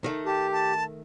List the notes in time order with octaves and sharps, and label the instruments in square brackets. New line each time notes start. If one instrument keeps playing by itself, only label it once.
[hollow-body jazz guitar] D#3 A3
[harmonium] G4 [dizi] A5
[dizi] A5